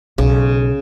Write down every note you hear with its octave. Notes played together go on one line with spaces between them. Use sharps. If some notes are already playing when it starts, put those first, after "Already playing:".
B1 C#3